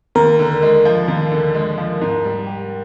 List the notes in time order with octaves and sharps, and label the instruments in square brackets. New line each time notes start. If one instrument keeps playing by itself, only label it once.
[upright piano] D#2 [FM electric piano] A#4
[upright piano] D3
G#3
F3
D#2
D3
G#3
F3
G#2
G3
G4